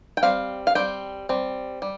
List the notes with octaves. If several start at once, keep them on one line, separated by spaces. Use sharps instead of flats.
G5
G3 C4 F5
F5
G3 C4 G5
G3 C4
G3